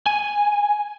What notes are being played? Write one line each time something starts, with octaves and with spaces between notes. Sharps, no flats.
G#5